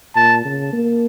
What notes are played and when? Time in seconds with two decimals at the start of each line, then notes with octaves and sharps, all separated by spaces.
0.16 A#2 A5
0.45 C#3
0.73 A#3